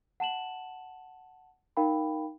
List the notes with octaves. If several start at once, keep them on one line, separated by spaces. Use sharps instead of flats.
F#5 A5 E7 F#7
D#4 A#4 F5 G5 B5